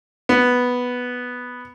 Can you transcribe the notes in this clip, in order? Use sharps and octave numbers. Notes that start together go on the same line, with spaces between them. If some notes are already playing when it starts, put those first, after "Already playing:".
B3